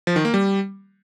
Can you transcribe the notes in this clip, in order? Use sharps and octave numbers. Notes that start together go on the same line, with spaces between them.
F3
D#3
A#3
G3